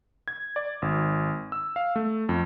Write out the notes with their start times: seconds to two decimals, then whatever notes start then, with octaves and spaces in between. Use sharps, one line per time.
0.28 G#6
0.56 D5
0.82 G#1
1.52 E6
1.76 F5
1.96 A3
2.29 F2